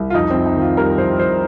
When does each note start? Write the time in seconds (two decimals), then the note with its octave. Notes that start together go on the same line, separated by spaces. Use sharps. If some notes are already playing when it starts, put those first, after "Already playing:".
Already playing: C2
0.10 F4
0.14 F2 D#4
0.31 F2 C4
0.46 D#4
0.57 D#3 F4
0.77 G3 A#4
0.98 F2 C5
1.19 F2 C5